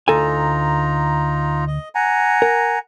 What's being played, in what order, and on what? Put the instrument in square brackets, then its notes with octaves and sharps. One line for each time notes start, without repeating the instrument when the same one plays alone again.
[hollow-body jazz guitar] D2 A4 G#5 [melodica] D#4 F4 A#5
[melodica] D#5
F#5 G#5 A#5
[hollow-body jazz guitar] A#4